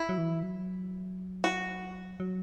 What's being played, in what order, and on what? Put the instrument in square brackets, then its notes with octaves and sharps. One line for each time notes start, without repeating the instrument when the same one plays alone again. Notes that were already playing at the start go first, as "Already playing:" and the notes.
Already playing: [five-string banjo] E4
[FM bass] F#3
E3
F#3
[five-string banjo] F#4
[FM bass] F#3